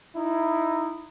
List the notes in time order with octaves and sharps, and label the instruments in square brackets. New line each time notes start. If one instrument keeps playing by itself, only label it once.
[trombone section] D#4 E4